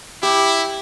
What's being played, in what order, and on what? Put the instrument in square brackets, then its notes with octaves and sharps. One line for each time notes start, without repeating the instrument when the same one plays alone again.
[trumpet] E4 [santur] G4